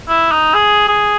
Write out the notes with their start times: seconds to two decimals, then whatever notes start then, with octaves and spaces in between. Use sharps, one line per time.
0.09 E4
0.31 D#4
0.54 G#4
0.88 G#4